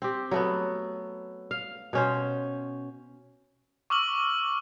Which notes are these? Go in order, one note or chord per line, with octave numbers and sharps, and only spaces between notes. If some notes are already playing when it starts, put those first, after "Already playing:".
C4 G4
F#3 A3 B3
F5
B2 C#4 C5
C#6 D6 E6 F6 F#7